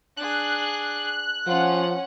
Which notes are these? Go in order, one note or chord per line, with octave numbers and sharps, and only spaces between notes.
D4 G#4 F#6
F3 C#4 F4 F#5